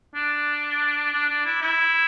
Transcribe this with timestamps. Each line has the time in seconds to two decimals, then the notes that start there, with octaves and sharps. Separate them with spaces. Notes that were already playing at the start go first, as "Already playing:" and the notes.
0.15 D4
1.13 D4
1.29 D4
1.45 E4
1.62 E4